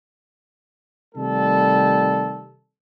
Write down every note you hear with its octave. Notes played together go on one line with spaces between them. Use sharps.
C3 D#3 G3 A3 A4